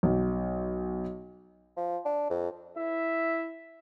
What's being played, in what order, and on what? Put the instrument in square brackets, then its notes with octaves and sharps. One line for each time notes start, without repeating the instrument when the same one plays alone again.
[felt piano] B1
[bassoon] F3
D4
F2
[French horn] E4 [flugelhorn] E5